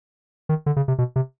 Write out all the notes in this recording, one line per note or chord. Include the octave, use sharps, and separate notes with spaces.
D#3
D3
C#3
C3
B2
C3